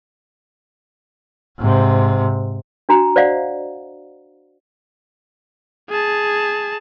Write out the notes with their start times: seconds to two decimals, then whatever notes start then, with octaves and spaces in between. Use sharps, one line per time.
1.59 G#2 C3
2.89 D4 F#4 A#5
3.16 C5 D5 D#5 F5 F#5
5.90 G#4 A5